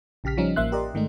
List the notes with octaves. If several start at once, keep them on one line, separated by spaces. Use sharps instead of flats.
A#1 C#3 G4 F6 B6
F3 G3 C#4 D#4
A1 F3 A#3 E5 C6 F#6
G4 A#4 D5 D#5
G#2 D#3 G#3 A3 D#4